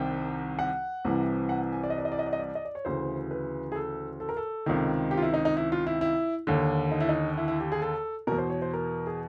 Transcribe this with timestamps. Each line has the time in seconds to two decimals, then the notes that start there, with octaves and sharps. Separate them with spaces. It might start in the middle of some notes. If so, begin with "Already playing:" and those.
Already playing: C2 C3 D#3 G5
0.59 F#5
1.05 C2 C3 E3
1.49 F#5
1.73 G#5
1.83 D5
1.90 D#5
1.98 D5
2.05 D#5
2.12 D5
2.19 D#5
2.26 D5
2.33 D#5
2.39 D5
2.55 D#5
2.65 D5
2.75 C#5
2.85 D2 C#3 E3 C5
3.31 B4
3.72 G#4
3.75 A4
4.20 A4
4.29 A#4
4.37 A4
4.66 C#2 C3 D#3
5.11 G4
5.17 F4
5.22 E4
5.34 D#4
5.45 D#4
5.57 E4
5.72 F4
5.87 E4
6.01 E4
6.47 D#2 D3
6.91 D#4
7.00 E4
7.09 D#4
7.38 E4
7.48 E4
7.60 G4
7.72 G#4
7.82 A4
8.27 B2 A#4
8.32 E2
8.38 C5
8.50 C#5
8.62 C5
8.73 A#4
9.07 G#4